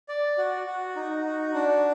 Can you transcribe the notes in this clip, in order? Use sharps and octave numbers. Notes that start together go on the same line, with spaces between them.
D5
F#4
F#4
D#4
F#4
D4